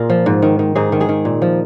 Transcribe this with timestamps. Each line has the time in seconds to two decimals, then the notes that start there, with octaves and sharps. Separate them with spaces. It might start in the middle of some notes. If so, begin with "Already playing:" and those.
Already playing: A#2 F4 G#4 A#4
0.10 F3
0.26 G#2
0.42 D#3
0.59 D#3
0.75 G#2 D#4 G#4
0.92 D#3
1.00 D#4 G#4
1.09 D#3
1.25 A#2
1.42 F3